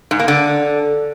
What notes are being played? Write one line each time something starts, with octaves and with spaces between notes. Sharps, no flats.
G#2
A#3
D3